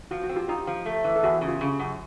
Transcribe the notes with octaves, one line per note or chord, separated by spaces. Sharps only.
F3 F#4
F#4
C4
F4 G4
D#4 F4 G4
F3
A3
E3
A4
E2 F#4 G#4
C#3
F4 G4
C#3
F#2